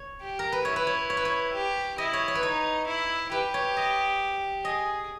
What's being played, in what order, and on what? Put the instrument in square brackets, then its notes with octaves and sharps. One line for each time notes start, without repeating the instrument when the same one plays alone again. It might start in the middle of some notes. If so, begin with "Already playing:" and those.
Already playing: [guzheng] C#5
[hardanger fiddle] G4
[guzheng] A#4
B4
[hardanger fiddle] E4 [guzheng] C#5
[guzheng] B4
C#5
C#5
B4
C#5
[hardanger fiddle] G4
[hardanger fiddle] E4 [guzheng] D#5
[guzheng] C#5
C#5
B4
[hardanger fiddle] D#4 [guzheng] C#5
[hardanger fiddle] E4
[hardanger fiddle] G4 [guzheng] B4
[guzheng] C#5
D#5
[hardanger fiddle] G#4 [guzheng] D#5